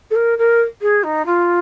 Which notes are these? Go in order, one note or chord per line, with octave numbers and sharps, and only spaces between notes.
A4
A#4
A#4
G#4
D#4
F4